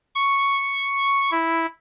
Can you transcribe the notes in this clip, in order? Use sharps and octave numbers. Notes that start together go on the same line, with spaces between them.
C#6
E4